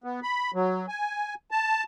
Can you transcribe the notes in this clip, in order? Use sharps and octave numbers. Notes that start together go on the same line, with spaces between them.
B3
B5
F#3
G#5
A5